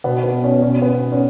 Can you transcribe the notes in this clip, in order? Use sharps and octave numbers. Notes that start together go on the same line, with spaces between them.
B2 B3
B3
C#4
B2 C#4
B3
C#4